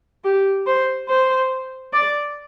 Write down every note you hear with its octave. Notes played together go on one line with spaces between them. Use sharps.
G4
C5
C5
D5